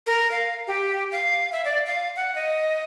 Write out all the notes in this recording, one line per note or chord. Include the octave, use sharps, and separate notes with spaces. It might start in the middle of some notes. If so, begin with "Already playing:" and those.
A#4
F5
G4
F5
E5
D5
F5
F#5
D#5